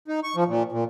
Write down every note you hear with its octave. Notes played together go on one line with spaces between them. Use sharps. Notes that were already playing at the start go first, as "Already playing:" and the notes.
D#4
C#6
F3
A#2
A#2